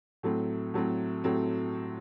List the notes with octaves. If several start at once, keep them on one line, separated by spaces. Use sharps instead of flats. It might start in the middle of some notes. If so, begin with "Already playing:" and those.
A2 F#3 A3 C4
A2 F#3 A3 C4
A2 F#3 A3 C4